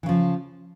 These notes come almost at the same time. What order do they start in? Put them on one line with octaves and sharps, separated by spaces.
E3 C#3 F3